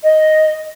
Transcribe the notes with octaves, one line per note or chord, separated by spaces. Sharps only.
D#5